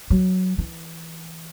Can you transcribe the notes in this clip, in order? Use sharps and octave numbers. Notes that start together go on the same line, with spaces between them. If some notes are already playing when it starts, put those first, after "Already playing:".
F#3
E3